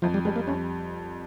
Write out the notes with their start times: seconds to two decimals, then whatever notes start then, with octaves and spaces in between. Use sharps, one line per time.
0.02 F2 F3
0.14 G3
0.25 G3 G#3
0.36 A#3
0.47 F2 C#4